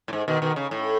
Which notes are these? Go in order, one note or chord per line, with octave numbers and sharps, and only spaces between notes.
A2
G#2
B2 D#3
B2 D#3
C#3
A2